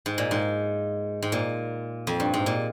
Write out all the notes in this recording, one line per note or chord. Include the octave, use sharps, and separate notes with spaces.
G#2
A#2
G#2
G#2
A#2
F2
G2
G#2
A#2